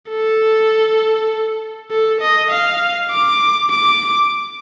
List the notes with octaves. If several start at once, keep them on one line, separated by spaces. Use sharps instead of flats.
A4
A4
D#5
F5
D6
D6